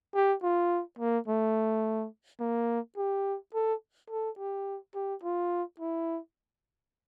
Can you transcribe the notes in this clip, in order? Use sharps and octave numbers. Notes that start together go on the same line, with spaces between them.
G4
F4
A#3
A3
A#3
G4
A4
A4
G4
G4
F4
E4